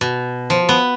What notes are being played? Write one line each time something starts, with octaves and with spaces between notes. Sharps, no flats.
B2
F3
B3